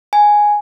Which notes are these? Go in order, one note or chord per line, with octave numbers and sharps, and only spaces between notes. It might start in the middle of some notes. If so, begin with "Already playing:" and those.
G#5